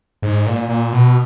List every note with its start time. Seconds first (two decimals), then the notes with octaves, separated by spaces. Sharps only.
0.22 G#2
0.47 A#2
0.69 A#2
0.93 B2